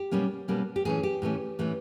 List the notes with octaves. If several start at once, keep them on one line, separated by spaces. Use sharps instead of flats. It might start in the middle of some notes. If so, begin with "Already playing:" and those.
Already playing: G4
B2 G3 A#3 C#4
B2 G3 A#3 C#4
G4
A2 E3 A3 C#4 G#4
G4
A2 E3 A3 C#4
A2 E3 A3 C#4